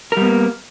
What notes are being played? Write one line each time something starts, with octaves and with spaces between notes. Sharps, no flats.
G3 A#3 B3 A#4